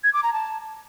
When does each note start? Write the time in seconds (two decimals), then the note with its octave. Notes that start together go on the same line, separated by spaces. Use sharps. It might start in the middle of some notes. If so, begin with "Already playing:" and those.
0.04 G#6
0.13 D6
0.23 A#5
0.33 A5